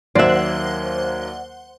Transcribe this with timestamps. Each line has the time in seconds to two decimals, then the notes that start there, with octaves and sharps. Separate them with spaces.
0.15 D#2 F#3 A#3 C5 D5 E5 F#5